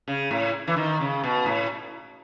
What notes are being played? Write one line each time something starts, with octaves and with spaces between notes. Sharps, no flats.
C#3
A2
E3
D#3
C#3
B2
A2